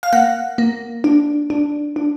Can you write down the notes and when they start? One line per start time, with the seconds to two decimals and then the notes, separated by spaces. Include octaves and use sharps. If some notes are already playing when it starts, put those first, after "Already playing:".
0.03 F5
0.13 A#3 F#5
0.58 A#3
1.04 D4
1.50 D4
1.96 D4